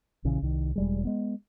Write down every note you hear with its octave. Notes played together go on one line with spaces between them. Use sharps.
A#1 C#3 E3
C2 D#3
E1 G3 G#3
G#3 B3